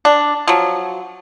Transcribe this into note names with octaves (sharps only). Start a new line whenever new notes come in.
D4
F3 F#3